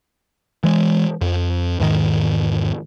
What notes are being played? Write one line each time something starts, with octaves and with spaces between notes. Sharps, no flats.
E3 G#3
F2
E2 G#2 D#3